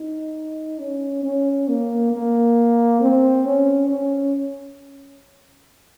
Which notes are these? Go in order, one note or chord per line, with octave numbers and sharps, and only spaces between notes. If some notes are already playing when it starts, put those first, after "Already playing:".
Already playing: D#4
C#4
C#4
A#3
A#3
C4
C#4
C#4